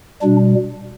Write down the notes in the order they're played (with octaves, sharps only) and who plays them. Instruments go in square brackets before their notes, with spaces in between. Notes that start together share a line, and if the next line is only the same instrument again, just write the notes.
[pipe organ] B2 G3 D4